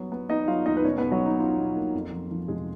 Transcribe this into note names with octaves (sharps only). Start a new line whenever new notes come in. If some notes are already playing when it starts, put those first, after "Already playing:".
Already playing: F#3 B3
B3
B3 D#4 D#5
F#3 F4 F5
D#2 D#4 D#5
B4
B2 C#4 C#5
B1 B3 B4
F#3 F#4
C#4 D#4
C#4 F4
B2
A#3
F2
F3
F3
F1 G#3 G#4